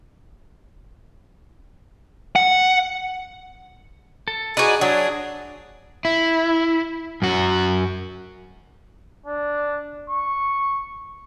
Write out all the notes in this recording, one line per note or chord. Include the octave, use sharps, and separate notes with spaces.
F#5
A4
D#4 F#4 G#4 B4 D5 G#5
F#3 D4 F#4 G#4
E4
F#2 F#4
D4
C#6